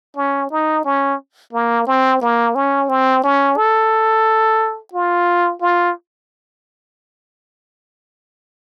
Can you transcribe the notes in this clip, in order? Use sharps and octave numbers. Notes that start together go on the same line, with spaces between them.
C#4
D#4
C#4
A#3
C4
A#3
C#4
C4
C#4
A4
F4
F4